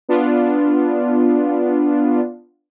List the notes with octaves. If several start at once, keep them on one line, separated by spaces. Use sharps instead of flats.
B3 D4 F4